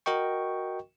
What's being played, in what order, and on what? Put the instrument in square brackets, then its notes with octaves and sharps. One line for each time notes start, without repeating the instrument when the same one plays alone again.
[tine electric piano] F#4 A#4 D#5 G5 C#6